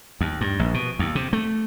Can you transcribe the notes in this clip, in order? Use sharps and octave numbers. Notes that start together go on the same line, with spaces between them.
D#2
G2
A#1
B2
D#2
C3
A3